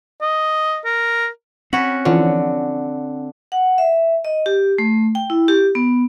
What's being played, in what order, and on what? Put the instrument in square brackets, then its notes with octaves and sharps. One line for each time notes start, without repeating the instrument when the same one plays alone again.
[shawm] D#5
A#4
[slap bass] C4 [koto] C#4 F#4 [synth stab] F#5 B5
[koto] D3 [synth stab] E3 F3 C#4
[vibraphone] F#5
E5
D#5
G4
A3
G5
E4
G4
B3